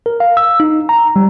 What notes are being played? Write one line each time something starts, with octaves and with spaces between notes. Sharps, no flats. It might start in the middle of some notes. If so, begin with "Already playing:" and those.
A#4
F5
E6
D#4
A#5
G3